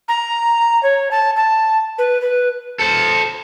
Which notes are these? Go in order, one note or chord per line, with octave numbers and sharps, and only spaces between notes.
A#5
C#5
A5
A5
B4
B4
A4 C5